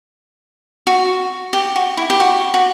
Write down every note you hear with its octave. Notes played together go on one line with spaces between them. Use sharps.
F#4
G4
F#4
E4
G4
F#4
F#4